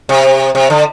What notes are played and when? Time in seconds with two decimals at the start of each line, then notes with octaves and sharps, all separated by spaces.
0.09 C3
0.55 C3
0.70 D3